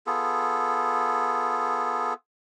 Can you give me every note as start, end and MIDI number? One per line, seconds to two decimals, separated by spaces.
0.07 2.14 59
0.07 2.14 65
0.07 2.14 68
0.07 2.14 69